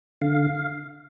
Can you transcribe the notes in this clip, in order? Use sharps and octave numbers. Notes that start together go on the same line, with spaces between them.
D3 F5